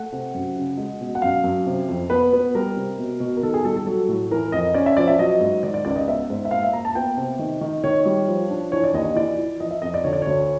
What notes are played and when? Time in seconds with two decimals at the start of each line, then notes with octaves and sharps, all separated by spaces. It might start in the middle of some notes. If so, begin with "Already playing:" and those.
Already playing: A3 F#5
0.12 C3
0.34 F#2
0.57 C#3
0.77 G#3
1.01 B2
1.15 F#5
1.22 F#2 F5
1.44 F#2
1.66 C3
1.88 F2
2.10 B3 B4
2.33 B3
2.55 G3 A#4
2.76 C3
2.99 B2
3.20 B2
3.37 A#4
3.43 D#3 A4
3.54 G#4
3.65 G3 A4
3.76 A4
3.87 F#3 A4
4.08 A2
4.31 E3 A#4
4.52 F2 D#5
4.74 C#4 D5
4.86 E5
4.97 F3 D5
5.08 E5
5.19 F#3 D#5
5.41 G#2
5.63 D#3 D5
5.74 D5
5.85 C#2 D5
5.96 D#5
6.08 B3 E5
6.30 G#2
6.45 E5
6.51 A#3 F5
6.63 E5
6.73 A#3 A#5
6.85 A5
6.95 B3 G5
7.17 C3
7.39 D#3
7.61 D#3
7.84 D#3 C#5
8.06 G3
8.28 F3
8.50 D4
8.72 E3 C#5
8.84 D5
8.94 D#2 D#5
9.05 D#5
9.16 E3 D5
9.38 E3
9.60 F3 D#5
9.71 E5
9.82 F2 D#5
9.94 D5
10.04 D3 C#5
10.13 D5
10.22 D2 C#5